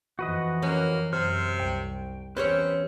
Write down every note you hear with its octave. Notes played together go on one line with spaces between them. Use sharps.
F2 E3 F#4 B4 D#5
A#3 C#4
F#2 C3 C5 F6
C2 G5
E2 C4 C#4 G4 B4 C#5